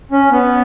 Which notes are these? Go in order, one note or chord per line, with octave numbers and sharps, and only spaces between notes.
C#4
B3